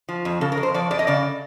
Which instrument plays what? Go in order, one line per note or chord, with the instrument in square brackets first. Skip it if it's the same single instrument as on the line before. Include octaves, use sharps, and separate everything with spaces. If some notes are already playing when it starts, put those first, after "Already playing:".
[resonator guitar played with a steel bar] F3
F2
C#3 A4
A#4
F2
C5
F3 D5
F2 D5
D#5
C#3 D5